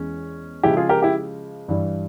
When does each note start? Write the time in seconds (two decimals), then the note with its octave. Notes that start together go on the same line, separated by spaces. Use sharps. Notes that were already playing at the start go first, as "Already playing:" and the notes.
Already playing: E2 E3 G#3 C#4
0.63 C#3 F3 G#3 E4 G4
0.77 F4 G#4
0.89 G4 A#4
1.02 E4 G4
1.68 G2 E3 G3